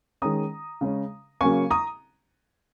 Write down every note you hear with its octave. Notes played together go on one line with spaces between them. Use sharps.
D#3 G#3 C#4 A#5 D#6
C#3 G#3 C#4
C#3 F#3 A#3 C#4 G#5 C#6
A#5 D#6